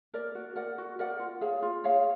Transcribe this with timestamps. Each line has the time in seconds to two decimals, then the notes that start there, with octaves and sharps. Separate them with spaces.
0.14 A#4 D5
0.35 F#4
0.56 A#4 D5 F#5
0.78 F#4
0.99 A#4 D5 F#5
1.19 F4
1.41 G#4 C#5 F5
1.62 F4
1.84 G#4 C#5 F5